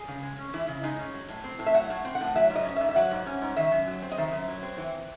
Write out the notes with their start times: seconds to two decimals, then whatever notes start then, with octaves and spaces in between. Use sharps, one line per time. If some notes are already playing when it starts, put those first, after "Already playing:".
Already playing: G#4
0.08 C#3
0.23 G#3
0.39 C#4
0.53 E3 E4
0.68 C#3
0.83 G#3 D#4
0.99 C#4
1.14 F#3
1.29 A2
1.44 C4
1.59 A2
1.66 E5
1.74 F#3 F#5
1.90 A2
2.05 C4
2.15 F#5
2.21 A2
2.36 F#3 E5
2.50 G#2
2.56 D#5
2.65 C#4
2.76 E5
2.81 G#2
2.89 E5
2.96 F#3 F#5
3.11 G#2
3.27 C#4
3.42 G#2
3.57 D#3 E5
3.72 F#2
3.87 F#3
4.02 C4
4.12 D#5
4.18 D#3 E5
4.32 F#2
4.48 F#3
4.63 C4
4.78 E3